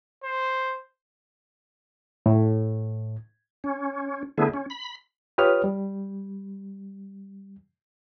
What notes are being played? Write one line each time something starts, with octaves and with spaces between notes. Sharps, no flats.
C5
A2
C#4
D3 A3 B3 E4 G#4
C#4
B5
F4 G4 B4 C#5 D#6 F6
G3